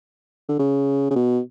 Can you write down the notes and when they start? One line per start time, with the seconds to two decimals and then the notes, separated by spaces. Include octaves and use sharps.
0.49 D3
0.59 C#3
1.11 C#3
1.15 B2